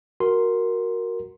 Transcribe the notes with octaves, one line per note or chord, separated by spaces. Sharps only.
F#4 A#4 C6